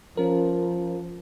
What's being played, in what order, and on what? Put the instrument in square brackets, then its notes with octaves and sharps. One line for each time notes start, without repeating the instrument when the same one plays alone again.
[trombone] F3 [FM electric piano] C#4 A#4